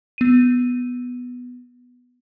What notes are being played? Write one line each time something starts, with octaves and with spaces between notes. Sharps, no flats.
B3 D#7